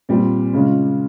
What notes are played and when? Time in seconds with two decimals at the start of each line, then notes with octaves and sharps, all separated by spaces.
0.09 A#2 G3 C4
0.53 C#3 G#3 C#4 F4